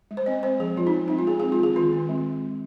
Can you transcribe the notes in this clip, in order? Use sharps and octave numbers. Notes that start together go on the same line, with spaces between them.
G#3
C5
C4 D#5
G#3 C5
F3 G#4
F3 F4
D#4
C4
G#3 D#4
F4
C4 G#4
G#4
G#3
F4
D#3 G#4
D#3 F4
C4
G#3